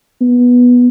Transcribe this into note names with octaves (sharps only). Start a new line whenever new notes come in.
B3